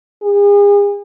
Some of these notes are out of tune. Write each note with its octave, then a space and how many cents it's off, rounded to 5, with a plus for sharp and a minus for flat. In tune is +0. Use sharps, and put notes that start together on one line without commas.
G#4 -40